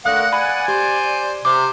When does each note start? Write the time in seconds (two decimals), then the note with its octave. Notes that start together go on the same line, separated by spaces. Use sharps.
0.05 D3 A3 A#4 F5 F#5 D#6 F#6
0.33 D5 F#5 G#5 B5
0.68 G4 C5
1.45 C3 C5 D6